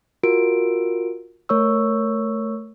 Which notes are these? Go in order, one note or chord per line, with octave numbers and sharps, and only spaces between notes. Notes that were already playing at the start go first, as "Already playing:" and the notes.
F4 F#4 A#4 D7
A3 A#4 C#5 C#6 E6